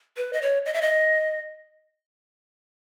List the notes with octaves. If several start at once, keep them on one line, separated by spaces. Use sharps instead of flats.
B4
D#5
C#5
D#5
E5
D#5